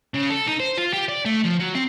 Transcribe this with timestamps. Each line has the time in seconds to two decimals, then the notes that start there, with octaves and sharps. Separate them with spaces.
0.14 C#3
0.30 A4
0.47 D#4
0.60 C5
0.78 F4
0.93 G4
1.09 D5
1.25 A3
1.44 F3
1.60 F#3
1.75 C4